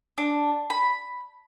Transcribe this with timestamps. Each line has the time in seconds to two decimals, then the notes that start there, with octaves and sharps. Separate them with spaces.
0.18 D4
0.70 B5